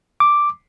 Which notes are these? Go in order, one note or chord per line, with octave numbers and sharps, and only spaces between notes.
D6